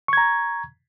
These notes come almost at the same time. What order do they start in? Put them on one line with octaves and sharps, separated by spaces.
C#6 G#6 A#5